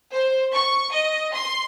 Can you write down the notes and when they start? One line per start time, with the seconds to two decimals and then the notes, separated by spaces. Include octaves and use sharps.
0.14 C5
0.53 C#6
0.92 D#5
1.33 C6